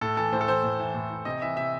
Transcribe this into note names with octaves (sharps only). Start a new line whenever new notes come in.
A2 A4
E3 A4
A2 C5
A4
E3 C5
A2
E3
A2
E3
C3 D#5
E3 E5
C3 E5